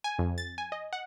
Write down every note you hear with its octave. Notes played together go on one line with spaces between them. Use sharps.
G#5
F2
A6
G#5
D#5
F#5